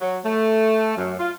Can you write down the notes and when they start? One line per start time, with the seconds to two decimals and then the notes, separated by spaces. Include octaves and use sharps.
0.01 F#3
0.25 A3
0.97 F#2
1.19 F4